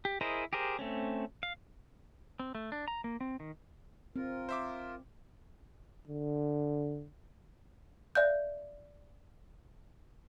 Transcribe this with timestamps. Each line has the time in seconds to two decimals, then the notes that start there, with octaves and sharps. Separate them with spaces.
0.05 G4
0.21 E4 G#4 A#4 C5 D#5
0.53 G4 G#4 A#4 C5
0.79 A3 C4 C#4
1.43 F5
2.39 C4
2.55 A3
2.72 D4
2.88 A#5
3.04 A#3
3.21 C4
3.40 D#3
4.16 C4 F4 A#4
4.49 C5 E5 D6
6.08 D3
8.15 D5 E5 F5 F#6 G6